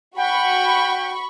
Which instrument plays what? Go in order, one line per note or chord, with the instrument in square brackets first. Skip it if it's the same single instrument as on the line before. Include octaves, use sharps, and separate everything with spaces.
[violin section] F#4 B5 C#6 [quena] F#5 [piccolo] G5